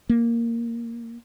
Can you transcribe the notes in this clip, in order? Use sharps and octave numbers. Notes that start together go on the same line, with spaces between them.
A#3